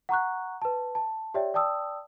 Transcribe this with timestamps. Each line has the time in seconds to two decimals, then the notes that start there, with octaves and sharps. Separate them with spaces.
0.09 F#5 A#5 C#6 F#6
0.62 B4 A5
0.95 A5
1.34 G4 C#5 D5 E5 G5
1.54 D5 G5 A5 D#6 E6